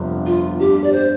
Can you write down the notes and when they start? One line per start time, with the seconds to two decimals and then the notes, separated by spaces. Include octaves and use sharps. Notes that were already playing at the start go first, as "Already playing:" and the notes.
Already playing: G1 F2 C3 F3
0.26 F4
0.58 G2 G3 D4 G4
0.84 D5
0.92 C5